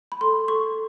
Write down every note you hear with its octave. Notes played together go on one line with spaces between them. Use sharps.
B5
A4 C6
A4 C#6